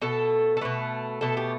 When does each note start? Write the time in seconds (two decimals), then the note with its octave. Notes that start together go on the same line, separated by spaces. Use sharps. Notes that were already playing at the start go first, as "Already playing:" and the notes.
0.01 B2 A3 A4
0.57 A4
0.61 B2 A3 B4
1.21 B2 A3 A4
1.37 G4